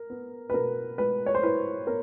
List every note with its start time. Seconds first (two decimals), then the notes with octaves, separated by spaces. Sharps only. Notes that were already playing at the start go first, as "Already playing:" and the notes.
Already playing: A#4
0.10 B3
0.50 B4
0.54 B2 A#4
0.98 G#3 B4
1.26 C#5
1.35 C5
1.43 E4 B4
1.87 B3 A#4